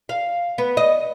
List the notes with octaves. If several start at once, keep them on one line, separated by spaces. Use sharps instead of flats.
F5
B3
D#5